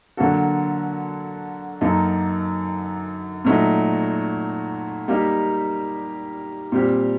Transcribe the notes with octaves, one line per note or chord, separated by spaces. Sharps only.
D3 F#3 A#3 F#4 A4
F#2 F#3 A#3 D#4 A4
A#2 F#3 A3 D#4
G3 A#3 D#4 G4
A#2 G3 C4 G4